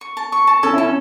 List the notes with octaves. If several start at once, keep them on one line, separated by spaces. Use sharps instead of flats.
C#6
A5
C#6
A5
C#4 A4
E4
A4
C#4